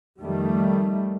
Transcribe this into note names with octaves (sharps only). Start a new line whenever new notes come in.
F2 D#3 G3 A3